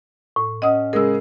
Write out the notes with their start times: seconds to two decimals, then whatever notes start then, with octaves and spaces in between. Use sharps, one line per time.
0.36 A2
0.62 C#4 D#5 F#5 D#6
0.93 C#3 G#3 G#4 A#4 E6